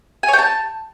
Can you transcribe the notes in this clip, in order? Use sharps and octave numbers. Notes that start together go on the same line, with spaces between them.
G#5
C#5
G5
A5